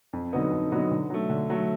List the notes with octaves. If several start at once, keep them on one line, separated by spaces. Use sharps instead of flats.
F2
D3 F#3 B3 D#4
F2
D3 F#3 B3 D#4
D3
F#3 A3
D3
F#3 A3